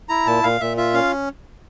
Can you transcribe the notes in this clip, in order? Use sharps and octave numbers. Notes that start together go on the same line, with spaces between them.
E4 A#5
A#2 A5
A#2 F5
A#2 E5
F4 E5
C#4 F5